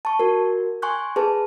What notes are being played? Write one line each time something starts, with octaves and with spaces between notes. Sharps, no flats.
A5 C#6
F#4 A#4
G#5 C6 C#6 F#6 G6
G#4 B4 A5